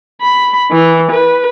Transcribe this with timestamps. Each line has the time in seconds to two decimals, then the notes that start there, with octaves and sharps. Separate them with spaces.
0.21 B5
0.71 E3
1.11 B4